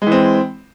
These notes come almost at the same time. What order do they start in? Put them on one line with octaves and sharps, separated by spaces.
G#3 E3 C4